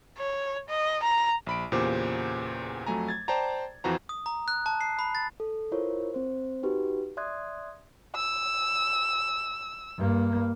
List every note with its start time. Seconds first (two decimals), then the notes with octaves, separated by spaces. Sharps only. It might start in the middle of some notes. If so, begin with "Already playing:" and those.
0.18 C#5
0.68 D#5
1.03 A#5
1.47 A#1 B5 D7
1.72 E2 A#2 C#3 G4 C5 D6
2.86 F2 F#3 A3 G#5 A#5
3.08 G#6 A6
3.28 C5 D5 G5 A5 A#5
3.84 F2 E3 F3 F#4 C5 A#5
4.09 D#6
4.26 A#5
4.48 F#6
4.66 A5
4.81 C7
4.99 B5
5.15 A6
5.40 A4
5.72 E4 F4 A#4 C5 C#5
6.14 C4 C5
6.63 D#4 F#4 G4 B4
7.17 D5 E5 C6 D#6 F#6 G#6
8.15 E6
9.98 G2 A#3